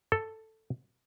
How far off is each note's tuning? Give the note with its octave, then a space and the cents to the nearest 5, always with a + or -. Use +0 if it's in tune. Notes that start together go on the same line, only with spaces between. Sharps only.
A4 +5